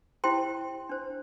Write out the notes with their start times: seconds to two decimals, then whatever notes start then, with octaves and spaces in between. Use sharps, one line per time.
0.24 E4 G4 C5 G5 C6
0.89 D4 C5